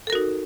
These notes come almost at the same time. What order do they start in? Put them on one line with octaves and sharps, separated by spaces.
A4 A#4 F#4 D#4